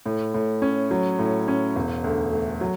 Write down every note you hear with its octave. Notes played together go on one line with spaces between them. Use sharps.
A2
A2
C#4
F#3
A2
C#4
E1
D2
A3
F#3